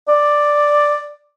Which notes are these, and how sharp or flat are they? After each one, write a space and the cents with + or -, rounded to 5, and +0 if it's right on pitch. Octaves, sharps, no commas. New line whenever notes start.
D5 +5